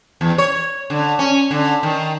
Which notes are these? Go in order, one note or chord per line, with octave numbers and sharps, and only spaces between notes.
E2
C#5
D3
C#4
D3
D#3